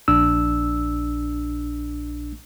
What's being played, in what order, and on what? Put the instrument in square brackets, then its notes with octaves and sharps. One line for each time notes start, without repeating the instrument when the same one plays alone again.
[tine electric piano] A#1 D4 E6